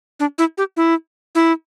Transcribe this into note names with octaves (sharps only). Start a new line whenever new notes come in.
D4
E4
G4
E4
E4